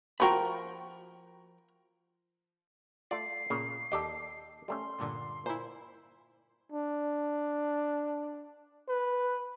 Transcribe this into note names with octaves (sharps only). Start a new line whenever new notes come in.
F3 F#4 A#4 G5 B5
A3 F4 D5 C7
A#2 C#3 A#3
D#2 G4 A4 D5 D#5
G3 A3 C#4 C6
G2 A#2 D3
A#2 E4 C5
D4
B4